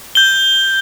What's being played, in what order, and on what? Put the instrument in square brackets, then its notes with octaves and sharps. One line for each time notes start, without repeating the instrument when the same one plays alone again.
[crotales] G6 G7